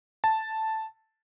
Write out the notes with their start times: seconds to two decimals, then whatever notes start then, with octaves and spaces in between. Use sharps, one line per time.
0.24 A5